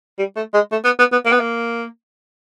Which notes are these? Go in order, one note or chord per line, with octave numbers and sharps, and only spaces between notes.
G3
A3
G#3
A3
B3
B3
B3
A#3
B3
A#3